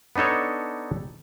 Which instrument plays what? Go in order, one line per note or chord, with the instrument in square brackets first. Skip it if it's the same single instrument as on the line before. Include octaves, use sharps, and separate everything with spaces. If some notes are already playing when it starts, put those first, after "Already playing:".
[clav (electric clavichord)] B3 D4 D#4 A4 C#5